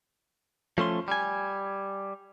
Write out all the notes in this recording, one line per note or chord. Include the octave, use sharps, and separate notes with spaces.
F3 A3 C#4 C6
G3 G#5